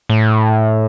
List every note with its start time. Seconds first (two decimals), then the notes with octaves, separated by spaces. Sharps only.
0.09 A2